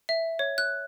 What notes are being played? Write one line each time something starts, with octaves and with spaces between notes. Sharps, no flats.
E5
C#5
F#6